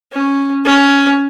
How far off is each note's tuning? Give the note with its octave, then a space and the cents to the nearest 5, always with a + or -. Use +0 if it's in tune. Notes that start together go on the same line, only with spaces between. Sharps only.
C#4 -5
C#4 +10